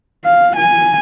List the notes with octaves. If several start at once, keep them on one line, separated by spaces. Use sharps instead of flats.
F5
G#5